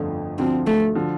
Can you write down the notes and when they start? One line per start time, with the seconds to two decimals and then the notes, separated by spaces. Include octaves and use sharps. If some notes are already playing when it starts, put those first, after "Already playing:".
Already playing: G1 F2 D3 F3 A3
0.38 D2 D3 F3 C4
0.67 A3
0.95 D3 F3